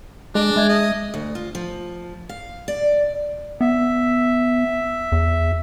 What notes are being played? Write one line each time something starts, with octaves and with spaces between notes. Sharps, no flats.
G#3 D4 G#4
G#3 E5 G#6
D#5
D2
F4
F3
F5
D5
B3 E5
E2